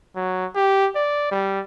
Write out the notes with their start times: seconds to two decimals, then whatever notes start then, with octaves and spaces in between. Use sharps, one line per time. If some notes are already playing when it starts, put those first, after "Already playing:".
0.16 F#3
0.55 G4
0.95 D5
1.31 G3